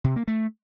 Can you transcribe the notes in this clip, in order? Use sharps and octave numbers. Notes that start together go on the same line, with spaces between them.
C3
A#3
A3